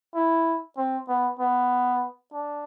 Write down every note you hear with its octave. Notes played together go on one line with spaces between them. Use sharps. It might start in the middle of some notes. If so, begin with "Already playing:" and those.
E4
C4
B3
B3
D4